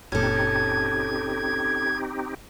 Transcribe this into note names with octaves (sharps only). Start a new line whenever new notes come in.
F#1 A#2 C4 C#4 D#4 G4 A4 G#6